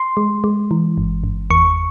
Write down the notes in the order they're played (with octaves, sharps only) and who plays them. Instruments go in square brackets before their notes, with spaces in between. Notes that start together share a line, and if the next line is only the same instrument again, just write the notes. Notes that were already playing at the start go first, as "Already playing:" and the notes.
Already playing: [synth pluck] C6
G#3
G#3
E3
G1
G1
E2 C#6